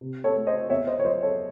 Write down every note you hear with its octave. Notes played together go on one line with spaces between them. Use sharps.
C3
A4 C#5
A3
C5 D#5
E2 C#5 E5
C5 D#5
C#5
F#3 C5 D#5
A4 C#5